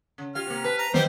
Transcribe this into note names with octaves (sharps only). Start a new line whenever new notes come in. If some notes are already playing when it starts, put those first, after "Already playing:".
C#3
F4 G4 F5 F6
C3 A#3
B4 A5
A#5
D#3 E3 F#3 G3 B3 G4 C5 D#5